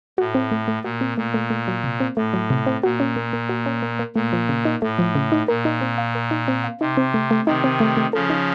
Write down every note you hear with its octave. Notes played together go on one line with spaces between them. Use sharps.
A2 F#4
C4
A3
A3
A#2 F#4
C4
A#2 A3
A3
A3
F#3
C3
C4
A2 A3
F#3
C3
C4
A#2 F#4
C#4
A#3
A#3
F#4
C#4
A#3
A#3
A#2 A3
F3
C#3
D#4
A2 A3
F3
C#3
D#4
A#2 A#4
D#4
C4
F5
A#4
D#4
C4
F5
C3 D#4
C4
A3
A3
C3 D#3 D#4
C4
A3
A3
C#3 F3 A4
D#4